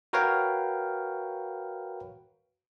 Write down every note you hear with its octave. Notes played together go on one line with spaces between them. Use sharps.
F#4 A#4 B4 C#5 F5 G5